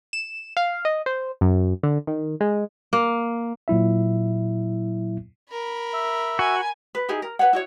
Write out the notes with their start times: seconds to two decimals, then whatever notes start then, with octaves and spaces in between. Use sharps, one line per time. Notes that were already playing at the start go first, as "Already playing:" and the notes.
0.13 E7
0.57 F5
0.85 D#5
1.06 C5
1.41 F#2
1.83 D3
2.07 D#3
2.41 G#3
2.93 A#3
3.68 A#2 F#3 E4 E5
5.52 A#4 B5
5.93 E5
6.39 F#4 G#5
6.95 B4
7.09 D#4 E4 G4 G#4
7.22 A#4
7.39 B4 C#5 F#5
7.53 E4 F#4 C#5